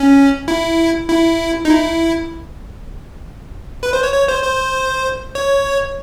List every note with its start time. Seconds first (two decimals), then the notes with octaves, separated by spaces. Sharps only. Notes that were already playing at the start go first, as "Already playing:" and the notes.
Already playing: C#4
0.48 E4
1.09 E4
1.65 D#4
1.70 E4
3.83 B4
3.93 C5
4.03 C#5
4.14 C#5
4.28 C5
4.44 C5
5.35 C#5